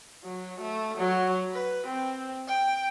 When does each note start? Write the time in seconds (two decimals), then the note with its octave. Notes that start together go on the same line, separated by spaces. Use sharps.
0.24 F#3
0.60 A3
0.97 F#3
1.52 B4
1.87 C4
2.48 G5